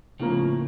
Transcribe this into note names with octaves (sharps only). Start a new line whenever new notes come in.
A2 C#3 F3 A#3